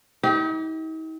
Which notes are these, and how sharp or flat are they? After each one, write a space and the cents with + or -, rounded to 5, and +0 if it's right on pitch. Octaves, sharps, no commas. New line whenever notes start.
D#4 +45 G4 -15